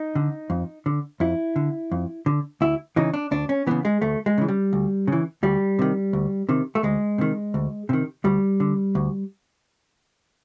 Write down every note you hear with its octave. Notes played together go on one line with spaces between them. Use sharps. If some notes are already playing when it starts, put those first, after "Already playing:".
Already playing: D#4
D3
F2
D3
F2 E4
D3
F2
D3
D2 E4
C#3 E3 D#4
D4
D2 D4
C#4
C#3 E3 B3
G#3
D2 A3
G#3
C#3 E3
G3
D2
C#3 E3
D2 G3
C3 D#3
D2
C3 D#3
A3
D2 G#3
C3 D#3
D2
C3 D#3
D2 G3
D3
D2